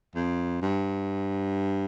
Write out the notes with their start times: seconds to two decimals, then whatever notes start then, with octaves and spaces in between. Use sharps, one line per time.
0.15 F2
0.62 G2